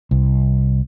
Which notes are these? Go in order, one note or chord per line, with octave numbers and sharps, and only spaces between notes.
C2